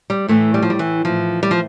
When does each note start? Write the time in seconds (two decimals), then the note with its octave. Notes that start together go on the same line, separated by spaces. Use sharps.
0.10 G3
0.28 A2 E3 A3
0.54 G3
0.63 F3
0.70 G3
0.79 E3
1.05 A2 E3 F3
1.43 G3
1.51 F3